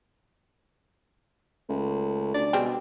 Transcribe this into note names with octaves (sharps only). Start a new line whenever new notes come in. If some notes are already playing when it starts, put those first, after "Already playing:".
C#2 A3
D2 D5
B2 G3 G#3 C4